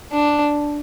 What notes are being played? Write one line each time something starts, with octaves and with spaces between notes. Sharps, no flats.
D4